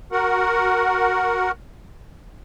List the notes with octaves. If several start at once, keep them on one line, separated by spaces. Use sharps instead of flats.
F#4 A#4 F#5